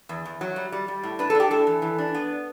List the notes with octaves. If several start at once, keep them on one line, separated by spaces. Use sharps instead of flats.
E2
E2
F#3
G3
G3
G3
A2
D4 B4
A4
D4 G4
A2 A4
E3
E3
D4
B3